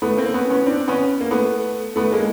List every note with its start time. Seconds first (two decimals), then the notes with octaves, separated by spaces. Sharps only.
0.02 A3 B3
0.18 A#3 C4
0.34 B3 C#4
0.50 B3 C#4
0.66 C4 D4
0.88 B3 C#4
1.21 A#3
1.31 A3 B3
1.96 A3 B3
2.12 G#3 A#3